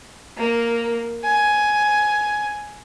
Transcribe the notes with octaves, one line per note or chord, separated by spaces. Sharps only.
A#3
G#5